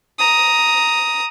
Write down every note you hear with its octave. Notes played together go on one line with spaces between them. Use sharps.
A#5 D#6